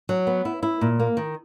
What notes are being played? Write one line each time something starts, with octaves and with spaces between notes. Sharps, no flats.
F#3
B3
E4
E4
A#2
A#3
D#3